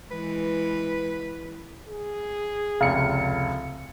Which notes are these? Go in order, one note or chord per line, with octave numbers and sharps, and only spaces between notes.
E3 G#3 B4
G#4
F1 C#2 F5 C#7